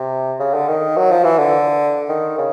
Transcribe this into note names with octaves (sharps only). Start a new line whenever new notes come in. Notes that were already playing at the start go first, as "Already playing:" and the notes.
Already playing: C3
C#3
D3
D#3
F#3
F3
E3
D3
D#3
C#3